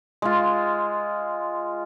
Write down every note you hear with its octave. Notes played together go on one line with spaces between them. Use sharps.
G#3 F4